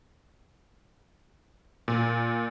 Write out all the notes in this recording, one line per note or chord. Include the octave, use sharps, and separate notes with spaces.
A#2